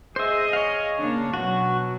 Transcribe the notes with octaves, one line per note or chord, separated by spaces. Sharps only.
G#4 C5 D#5 E5
C#5 F5
C#3 A#3 D4
B2 F#3 F#4